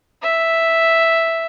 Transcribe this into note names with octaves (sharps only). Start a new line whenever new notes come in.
E5